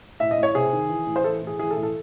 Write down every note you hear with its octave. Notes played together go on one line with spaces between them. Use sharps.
A2 E5
D#5
A2
C#5
C3 G#4
D#3
E3
A2
C5
E3 A4
A2
G#4
E3 G#4
A4
A2
A4